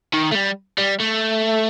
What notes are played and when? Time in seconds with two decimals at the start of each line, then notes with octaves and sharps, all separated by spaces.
0.14 D#3
0.32 A3
0.35 G3
0.78 G3
1.00 A3